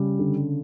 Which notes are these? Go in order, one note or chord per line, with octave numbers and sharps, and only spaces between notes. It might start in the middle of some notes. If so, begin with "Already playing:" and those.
Already playing: C#3 G3
D3